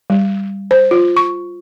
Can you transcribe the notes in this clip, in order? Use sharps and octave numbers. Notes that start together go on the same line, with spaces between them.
G3
C5
F4
C#6